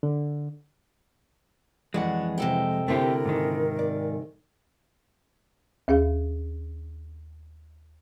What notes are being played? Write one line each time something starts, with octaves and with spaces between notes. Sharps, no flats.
D3
F2 E3 G#3 F#4 D5 F#5
C3 A4 G5
D3 A3 C4 E4 G4 A#4
G#2 D#3
D5
D#2 C#4 G#4 F5